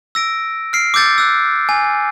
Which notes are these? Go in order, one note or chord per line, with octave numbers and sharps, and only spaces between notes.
E6 A#6 D7
F6 C7 D7
D6 E6 G6 A6 C#7
E6 F#6
G#5